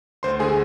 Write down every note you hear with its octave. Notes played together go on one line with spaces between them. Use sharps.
D2 C5 C6
D3 G#3 G#4 G#5